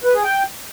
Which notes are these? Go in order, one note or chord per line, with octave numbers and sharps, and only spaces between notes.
B4
G#4
G5